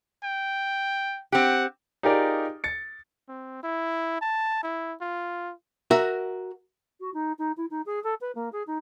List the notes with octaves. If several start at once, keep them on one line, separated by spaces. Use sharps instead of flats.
G5
C4 G4 F#5
D#4 F4 G4 G#4 A#4 D5
A6 C#7
C4
E4
A5
E4
F4
F#4 A#4 E5
F#4
D#4
D#4
E4
D#4
G#4
A4
B4
A#3
G#4
D#4